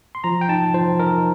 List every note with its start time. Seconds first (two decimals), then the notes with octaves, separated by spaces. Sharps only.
0.15 C6
0.24 F3 A#5
0.41 G5
0.49 D#4 A5
0.74 F3 C5
0.99 D#4 A#4